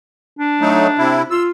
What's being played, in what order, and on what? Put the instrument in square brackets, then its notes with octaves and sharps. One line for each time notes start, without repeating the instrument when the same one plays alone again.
[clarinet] D4
[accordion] F#3 A3 D#4
C3 E4
[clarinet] F4 [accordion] E6